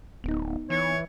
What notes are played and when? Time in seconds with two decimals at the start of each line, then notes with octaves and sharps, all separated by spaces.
0.24 D1 B3 D#4
0.70 E3 C#5